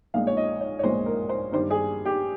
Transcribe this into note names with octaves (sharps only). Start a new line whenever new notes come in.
A#1 A#2 G#3 F5
C#5
D#5
C#5
C#5
A#1 A#2 G#3 C5
A#4
C5
G2 D#3 G3 C5
G#4
G4